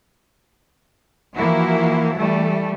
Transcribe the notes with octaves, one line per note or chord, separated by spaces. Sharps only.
E3 F3 A#3 E4 F#4
E3 G3 A3